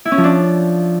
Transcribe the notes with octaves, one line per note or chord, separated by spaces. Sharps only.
E4
C#4
F3
D4